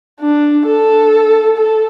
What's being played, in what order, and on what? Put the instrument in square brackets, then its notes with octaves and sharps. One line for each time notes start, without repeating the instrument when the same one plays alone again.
[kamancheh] D4
A4
A4